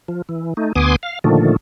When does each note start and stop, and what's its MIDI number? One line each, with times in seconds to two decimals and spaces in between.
0.08 0.22 53
0.29 0.54 52
0.57 0.73 57
0.57 0.73 63
0.76 0.96 38
0.76 0.96 59
0.76 0.96 80
0.76 0.96 84
0.76 0.96 86
0.76 0.96 87
1.03 1.19 77
1.24 1.56 46
1.24 1.56 50
1.24 1.56 51
1.24 1.56 53
1.24 1.56 57